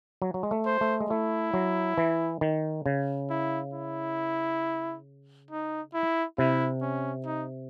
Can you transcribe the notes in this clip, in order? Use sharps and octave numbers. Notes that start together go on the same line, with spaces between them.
F#3
F#3
G#3
A3
C5
A3
G#3
A3 E4
F#3
E3
D#3
C#3
E4
E4
D#4
E4
C3 E4
C#4
D#4